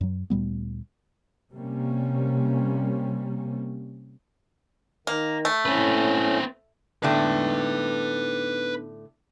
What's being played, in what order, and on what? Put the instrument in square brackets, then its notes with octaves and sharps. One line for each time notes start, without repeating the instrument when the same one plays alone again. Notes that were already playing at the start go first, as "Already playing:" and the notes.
[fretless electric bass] F#2 F#3
D2 A#2 G3 B3
[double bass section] C3 G3 A#3 C#4
[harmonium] D#3 [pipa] A#3
[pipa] A3
[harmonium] A2 C#4 [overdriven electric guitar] C4 B4
[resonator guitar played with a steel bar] A2 D3 A3 [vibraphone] B3 D4 D#4 [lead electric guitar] B4 G5